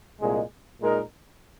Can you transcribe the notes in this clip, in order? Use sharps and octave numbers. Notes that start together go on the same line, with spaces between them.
C2 A#2 G#3
A#2 G#3 D#4 A#4